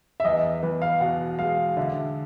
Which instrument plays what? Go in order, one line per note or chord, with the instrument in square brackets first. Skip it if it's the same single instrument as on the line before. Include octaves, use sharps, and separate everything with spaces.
[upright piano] E5
[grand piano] E2 [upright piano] D#5
[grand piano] E2 [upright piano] B4
[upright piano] F5
[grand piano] B2 [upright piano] F#5
[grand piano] G#3 [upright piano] F5
[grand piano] D3 [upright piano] E5